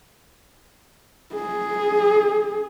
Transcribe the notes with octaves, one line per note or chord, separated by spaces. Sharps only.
G#4